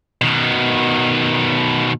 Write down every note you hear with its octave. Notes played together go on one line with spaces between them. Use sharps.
B2 D#3